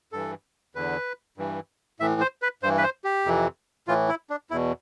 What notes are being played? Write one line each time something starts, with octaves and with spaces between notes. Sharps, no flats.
G2 E3 A4
E2 D3 B4
G2 E3
A2 E3 E5
C5
B4
G2 E3 C5
B4
C5
G4
F2 C3 E3
A2 E3 F4
E4
D4
E2 B2 E4